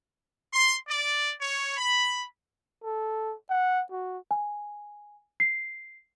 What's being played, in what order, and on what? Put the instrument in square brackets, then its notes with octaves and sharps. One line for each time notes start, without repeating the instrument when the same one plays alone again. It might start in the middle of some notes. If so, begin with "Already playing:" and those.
[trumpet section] C6
D5
C#5
B5
[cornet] A4
F#5
F#4
[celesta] G#5
C7